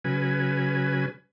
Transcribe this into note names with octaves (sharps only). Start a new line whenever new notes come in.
C#3 F#3 B4 G#5